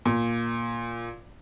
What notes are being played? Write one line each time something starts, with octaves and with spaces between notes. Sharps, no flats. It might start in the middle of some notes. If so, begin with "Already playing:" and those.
A#2